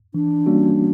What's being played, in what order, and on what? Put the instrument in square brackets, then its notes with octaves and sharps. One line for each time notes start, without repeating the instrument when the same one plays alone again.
[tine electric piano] E3 [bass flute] D4
[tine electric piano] G3 A#3 C#4 F#4